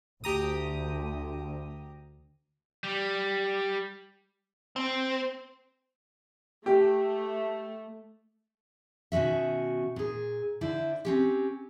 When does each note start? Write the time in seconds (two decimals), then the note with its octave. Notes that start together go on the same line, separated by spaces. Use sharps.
0.24 D2 G4 A#5 D#6
2.83 G3
4.76 C4
6.66 A3 G4
9.12 B2 D#3 C#4 F#4 E5
9.96 A#2 G#4
10.61 D3 E4 C5 D5
11.05 C4 C#4 G4